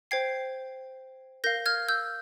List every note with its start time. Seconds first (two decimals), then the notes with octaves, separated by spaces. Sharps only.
0.11 C5 G5 G#6 C7
1.44 A#4 F5 G6 A#6
1.66 F6 G#6
1.88 E6 G6